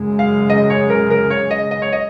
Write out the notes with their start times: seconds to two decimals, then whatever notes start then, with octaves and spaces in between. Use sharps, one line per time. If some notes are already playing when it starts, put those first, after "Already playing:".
Already playing: F#2 C#3 G#3
0.19 F5
0.50 D#5
0.70 C#5
0.90 A#4
1.10 A#4
1.30 C#5
1.51 D#5
1.71 D#5
1.82 C#5
1.92 D#5